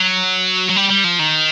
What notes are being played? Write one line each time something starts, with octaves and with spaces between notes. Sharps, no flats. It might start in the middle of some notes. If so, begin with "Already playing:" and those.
Already playing: F#3
F#3
G3
G3
F3
D#3